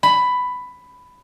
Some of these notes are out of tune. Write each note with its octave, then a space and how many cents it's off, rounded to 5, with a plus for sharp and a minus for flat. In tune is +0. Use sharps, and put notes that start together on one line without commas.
B5 +10